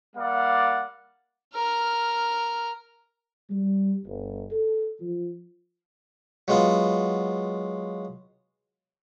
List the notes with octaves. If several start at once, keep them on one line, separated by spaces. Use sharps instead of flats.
G3 A#3 D5 F5 F#5
A#4 F6
G3
G1
A4
F3
F#3 G#3 B3 F4